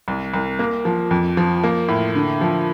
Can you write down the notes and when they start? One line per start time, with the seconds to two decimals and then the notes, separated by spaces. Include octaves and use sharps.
0.08 C2
0.34 C2
0.59 A#3
0.85 F3
1.11 F2
1.37 F3
1.64 A#3
1.88 A2
2.15 D3
2.41 F3